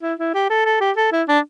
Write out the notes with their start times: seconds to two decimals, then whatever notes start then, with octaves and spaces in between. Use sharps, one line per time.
0.03 E4
0.19 E4
0.34 G4
0.50 A4
0.65 A4
0.80 G4
0.96 A4
1.12 E4
1.28 D4